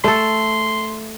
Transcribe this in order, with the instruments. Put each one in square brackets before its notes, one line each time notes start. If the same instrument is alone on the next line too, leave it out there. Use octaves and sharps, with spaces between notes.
[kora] A3 A4 [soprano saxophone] C6